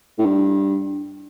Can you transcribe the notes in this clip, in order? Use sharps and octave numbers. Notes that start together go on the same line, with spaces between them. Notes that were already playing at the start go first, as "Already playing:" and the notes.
A2
G2